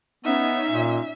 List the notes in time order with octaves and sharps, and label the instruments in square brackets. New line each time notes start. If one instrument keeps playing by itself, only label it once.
[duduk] B3 [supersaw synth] C#4 D#4 [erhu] E5
[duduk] A#2